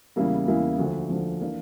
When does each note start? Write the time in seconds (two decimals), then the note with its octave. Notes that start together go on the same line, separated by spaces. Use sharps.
0.16 E2 C#3 G3 A#3 E4
0.48 E2 C#3 G3 A#3 E4
0.78 D2 D3 F3
1.10 D2 D3 F3
1.41 E3 A#3 D4